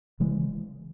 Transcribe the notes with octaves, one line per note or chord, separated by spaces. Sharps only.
C#3 E3 G#3